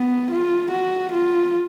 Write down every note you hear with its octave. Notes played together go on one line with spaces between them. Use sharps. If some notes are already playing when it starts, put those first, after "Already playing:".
Already playing: B3
F4
F#4
F4